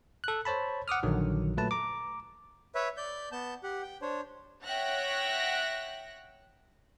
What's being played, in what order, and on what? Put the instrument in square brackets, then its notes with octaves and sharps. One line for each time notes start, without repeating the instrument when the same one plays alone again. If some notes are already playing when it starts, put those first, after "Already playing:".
[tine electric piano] A4 F#6
C5 C#5 A5 B5
F#5 D6 D#6 F6
A#1 D3 D#3 F#3
A#2 F#3 A3 B4 A5
A#5 D6
[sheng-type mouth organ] B4 C#5 E5
D5 G6
B3 A5 G6
G4 F#5
G5
D4 C5 C#5
[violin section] C#5 E5 F#5 G5 F#6 A#6